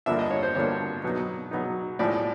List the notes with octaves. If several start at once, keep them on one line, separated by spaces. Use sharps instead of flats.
G2 D3 F3 A#3 D4 E5
D#5
C#5
C5
G2 D3 F3 A#3 D4 C#5
B2 F#3 B3 D#4
B2 F#3 B3 D#4
A2 F3 G#3 D5